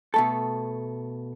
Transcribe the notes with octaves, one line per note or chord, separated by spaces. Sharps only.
B2 A3 A4